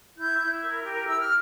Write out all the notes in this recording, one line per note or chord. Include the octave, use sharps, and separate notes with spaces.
E4 G6
E4
A#4
G4
E4 E6
F6